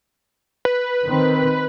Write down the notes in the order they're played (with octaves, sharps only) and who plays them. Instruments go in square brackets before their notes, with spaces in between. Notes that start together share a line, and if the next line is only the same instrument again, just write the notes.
[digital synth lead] B4
[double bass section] D#3 C4